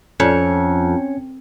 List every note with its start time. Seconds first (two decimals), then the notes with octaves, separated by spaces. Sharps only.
0.20 F2 C#4 G#6 C#7